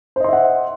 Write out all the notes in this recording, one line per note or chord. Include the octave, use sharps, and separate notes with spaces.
C5 D#5 E5 F#5 C6